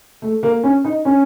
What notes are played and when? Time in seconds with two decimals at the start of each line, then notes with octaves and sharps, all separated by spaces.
0.22 A3
0.43 A#3
0.63 C#4
0.84 D#4
1.05 C#4